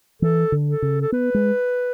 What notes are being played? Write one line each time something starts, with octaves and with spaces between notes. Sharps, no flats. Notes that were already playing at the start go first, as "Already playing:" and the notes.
E3 A4
D3
A4
C#3
A4
B3 B4
G#3